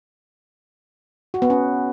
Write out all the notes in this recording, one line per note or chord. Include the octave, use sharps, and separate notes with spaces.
F#4
B3
C#4